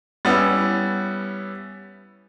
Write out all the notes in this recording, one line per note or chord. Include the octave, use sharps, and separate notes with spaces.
G3 B3 C#4 E4